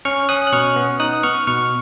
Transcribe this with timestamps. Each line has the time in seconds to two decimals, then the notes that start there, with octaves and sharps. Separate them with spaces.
0.05 C#4 C#6 F6
0.29 C#4 D#6 F#6
0.47 F#6
0.53 B2 C#6 F6
0.76 B3
1.00 D#4 D#6 F#6
1.23 B3 C#6 F6
1.47 B2 C#6 F6